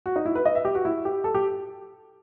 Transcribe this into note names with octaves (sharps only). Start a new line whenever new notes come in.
F#4
D#4
E4
B4
D#5
E5
G4
F#4
E4
G4
A4
G4